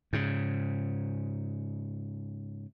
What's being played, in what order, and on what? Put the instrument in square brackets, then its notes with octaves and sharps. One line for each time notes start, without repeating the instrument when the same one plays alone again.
[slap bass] G#2 C#3